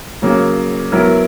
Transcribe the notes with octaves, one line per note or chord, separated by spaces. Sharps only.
C#3 F#3 A#3
F#3 B3 E4 A#4